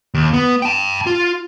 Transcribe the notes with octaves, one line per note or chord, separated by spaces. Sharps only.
D#2
B3
G5 A5
F4